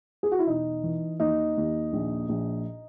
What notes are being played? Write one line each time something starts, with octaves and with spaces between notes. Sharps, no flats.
G#4
F#4
E4
E1 D#4
E3
D#2 D#4
D#2
A#1
A#1